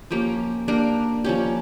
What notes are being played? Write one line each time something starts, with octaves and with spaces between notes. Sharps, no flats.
F3 A#3 C#4 G4
A#3 D4 G4 A#4
F3 A#3 C#4 G4